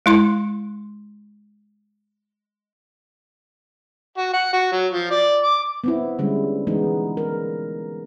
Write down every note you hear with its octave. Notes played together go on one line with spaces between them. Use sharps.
G#3 E4 C6
F#4
F#5
F#4
F#3
F3
D5
D6
B3 C4 E4
D3 G3 G#3 C#4
E3 G#3 B3 D#4
A#4